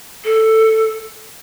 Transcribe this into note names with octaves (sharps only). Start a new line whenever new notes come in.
A4